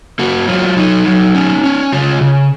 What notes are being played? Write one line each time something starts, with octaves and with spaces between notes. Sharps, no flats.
A#3 F#4
F#3 F4
F#3 D#4
F#3
C#4
C#4
C#3 F4
C#3